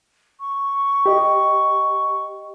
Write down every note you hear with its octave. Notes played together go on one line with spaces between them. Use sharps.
C#6
G4 D#5